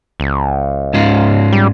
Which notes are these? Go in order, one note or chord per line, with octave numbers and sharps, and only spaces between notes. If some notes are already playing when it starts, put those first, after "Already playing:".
C#2
G#2 C#4 F4
G3